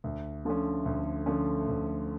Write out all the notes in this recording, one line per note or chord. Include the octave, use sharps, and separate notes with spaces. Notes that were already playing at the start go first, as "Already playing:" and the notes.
D2
D3 F3 A3 C#4
D2
D3 F3 A3 C#4
D2